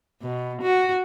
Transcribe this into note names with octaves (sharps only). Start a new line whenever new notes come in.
B2
F#4